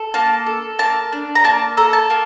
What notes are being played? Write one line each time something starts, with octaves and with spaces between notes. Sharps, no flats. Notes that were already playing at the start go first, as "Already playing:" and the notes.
Already playing: A4
A#3 A5
A4
A#3 A5
D4
A#5
A#3 A5
A4 A#5
A5
A#3